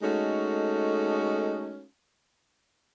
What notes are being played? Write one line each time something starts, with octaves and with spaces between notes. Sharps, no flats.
G#3 A3 C#4 D#4 F#4 A4